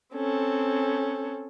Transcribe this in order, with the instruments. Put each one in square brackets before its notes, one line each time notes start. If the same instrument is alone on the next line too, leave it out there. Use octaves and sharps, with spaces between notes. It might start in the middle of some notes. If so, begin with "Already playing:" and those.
[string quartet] C4 C#4 A4